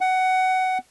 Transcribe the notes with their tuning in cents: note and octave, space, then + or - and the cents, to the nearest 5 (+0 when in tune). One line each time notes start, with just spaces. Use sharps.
F#5 +15